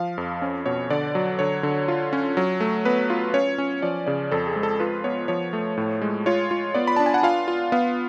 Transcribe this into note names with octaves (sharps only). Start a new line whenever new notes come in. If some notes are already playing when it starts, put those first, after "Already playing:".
Already playing: F3 F5
F2
C#4
B2 C#5
D3 D5
F#3
D3 C#5
D3
F4
C#4
F#3
A3
B3 B4
F4
C#4 C#5
C#4
F3 D5
C#3 D5
F2 A4
G#4
G#3
A4
F4 B4
B3 C#5
F3 C#5
A3
A2
G#3
F4 C#5
F4
B3 D5
B5
D4 A5
G#5
F#5
F4 F5
F4
B3 F5